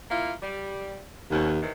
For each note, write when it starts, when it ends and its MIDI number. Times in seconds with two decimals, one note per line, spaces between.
0.10 0.31 58
0.10 0.31 64
0.10 0.31 65
0.41 1.00 55
1.31 1.60 39
1.31 1.50 47
1.31 1.50 60
1.31 1.50 61
1.60 1.70 48
1.60 1.70 51
1.60 1.70 52